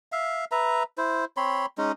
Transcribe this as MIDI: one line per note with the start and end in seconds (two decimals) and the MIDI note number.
0.12 0.45 76
0.12 0.45 77
0.51 0.83 71
0.51 0.83 76
0.51 0.83 82
0.97 1.25 64
0.97 1.25 72
1.37 1.66 60
1.37 1.66 73
1.37 1.66 83
1.37 1.66 84
1.78 1.92 56
1.78 1.92 61
1.78 1.92 63